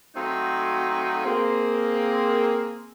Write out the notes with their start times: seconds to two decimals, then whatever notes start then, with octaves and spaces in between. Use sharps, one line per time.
0.15 F#3 A3 C4 D#4 F#4 F5
1.26 A#3 C4 G#4